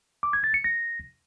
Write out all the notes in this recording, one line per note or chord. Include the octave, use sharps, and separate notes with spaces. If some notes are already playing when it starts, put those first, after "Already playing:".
D6
G#6
A6
C#7
A#6